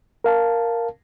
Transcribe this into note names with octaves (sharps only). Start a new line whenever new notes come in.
A#4 F5 A5